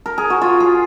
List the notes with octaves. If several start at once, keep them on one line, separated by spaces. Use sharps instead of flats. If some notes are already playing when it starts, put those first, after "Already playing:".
A#4
G#4
F#4
F4
G#4